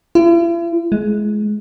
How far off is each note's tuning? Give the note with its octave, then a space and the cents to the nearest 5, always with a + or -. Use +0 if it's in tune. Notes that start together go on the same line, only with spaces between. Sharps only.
E4 +45
G#3 +20